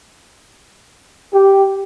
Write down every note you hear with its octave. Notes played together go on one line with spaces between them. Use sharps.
G4